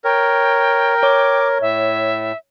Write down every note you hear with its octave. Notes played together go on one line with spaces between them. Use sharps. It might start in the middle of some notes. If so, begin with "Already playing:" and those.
A#4 C#5 G5
C#5 D6
A2 E5